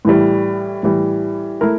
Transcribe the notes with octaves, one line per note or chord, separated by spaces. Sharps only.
A2 E3 G3
A2 E3 G3
A3 E4 A#4